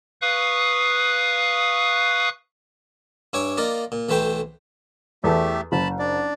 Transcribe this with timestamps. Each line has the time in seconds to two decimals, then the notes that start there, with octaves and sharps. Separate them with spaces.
0.22 B4 F5 C#6 D#6 F#6
3.33 G2 E4 C#5 G#5 D6
3.57 A#3 F4 D5 D#5
3.92 A#2
4.09 B1 E3 A3 B4 C5 G5
5.24 E2 A3 G4 A4 E5
5.72 F#1 A5 B5
5.99 D4 D5